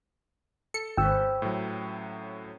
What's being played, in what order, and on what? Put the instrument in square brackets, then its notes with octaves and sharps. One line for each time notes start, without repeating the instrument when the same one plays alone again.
[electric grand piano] A4 [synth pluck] C#7
[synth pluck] G#1 [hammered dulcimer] C3 C#4 B4 [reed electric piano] G5 E6
[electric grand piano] A2 F#3